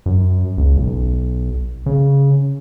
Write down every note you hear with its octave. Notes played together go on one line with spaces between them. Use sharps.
F#2
C#2
B1
C#3